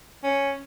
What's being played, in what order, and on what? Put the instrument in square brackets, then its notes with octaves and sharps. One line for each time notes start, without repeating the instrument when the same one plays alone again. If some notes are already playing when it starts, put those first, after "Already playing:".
[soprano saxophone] C#4